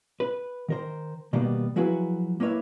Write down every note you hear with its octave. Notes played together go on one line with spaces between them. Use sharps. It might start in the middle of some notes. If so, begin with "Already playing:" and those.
B4
D#3 A#4 C5
B2 D#3 G3 A#3 B3
F3 F#3 E4 F#4 G#4 B4
A#3 E4 B4 C#5 E5